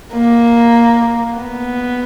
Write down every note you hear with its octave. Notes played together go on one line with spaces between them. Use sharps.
A#3
B3